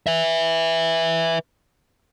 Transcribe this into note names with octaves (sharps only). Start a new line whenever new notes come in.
B4 E5